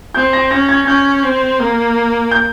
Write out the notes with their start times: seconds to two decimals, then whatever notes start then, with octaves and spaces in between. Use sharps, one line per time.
0.14 C4 G6
0.33 A#6
0.51 C#4 A#6
0.69 G#6
0.86 C#4 G6
1.23 C4
1.59 A#3
2.31 G6